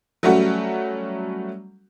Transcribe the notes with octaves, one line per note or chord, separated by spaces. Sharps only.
F#3 G3 A3 C#4 F#4